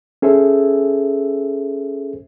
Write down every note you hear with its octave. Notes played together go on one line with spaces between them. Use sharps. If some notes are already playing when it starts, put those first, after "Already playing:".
C#4 G#4 A4 C5 E5